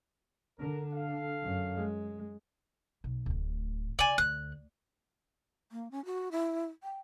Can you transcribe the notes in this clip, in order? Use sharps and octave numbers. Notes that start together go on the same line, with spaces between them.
D3 D4 A#4
A4 F5
F#2
G#3
B1
D1 A2
C#3 F4 D5 G#5
D2 F#6
A#3
C#4
F#4
E4
G5